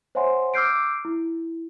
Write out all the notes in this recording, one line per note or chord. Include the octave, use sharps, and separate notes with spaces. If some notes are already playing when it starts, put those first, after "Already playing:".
C5 C#5 E5 F#5 G#5 C6
D6 E6 F6 G6 C7 D7
E4